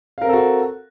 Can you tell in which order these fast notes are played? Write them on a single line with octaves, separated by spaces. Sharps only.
F5 A#4 C4 A4 F#4